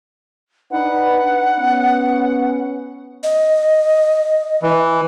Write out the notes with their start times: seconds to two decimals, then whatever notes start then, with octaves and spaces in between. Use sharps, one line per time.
0.71 D4 D#4 B4 F#5
1.58 B3 C#4
3.23 D#5
4.63 E3